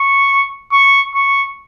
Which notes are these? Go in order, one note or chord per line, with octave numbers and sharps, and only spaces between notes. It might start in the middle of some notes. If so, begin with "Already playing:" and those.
Already playing: C#6
C#6
C#6